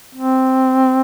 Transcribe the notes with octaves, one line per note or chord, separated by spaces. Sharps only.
C4